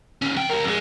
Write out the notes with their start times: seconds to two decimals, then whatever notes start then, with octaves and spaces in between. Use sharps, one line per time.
0.22 D#2 C#4
0.36 F3 G5
0.49 G4 A#4
0.65 F2 G#3